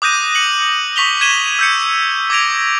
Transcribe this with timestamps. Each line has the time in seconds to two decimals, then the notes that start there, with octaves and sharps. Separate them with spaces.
0.02 D6 D#6 F#6 G6 A#6 D#7
0.35 C#7 F#7
0.96 C#6 B6 F7 G7
1.21 G#6 D#7 E7 G7
1.59 E6 G6 C#7
2.30 D6 G#6 A#6 D7 F7